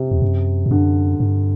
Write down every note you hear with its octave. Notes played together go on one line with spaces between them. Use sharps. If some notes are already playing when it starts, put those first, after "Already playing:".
Already playing: C3
E2
F#2
G2
F#2 D3
G2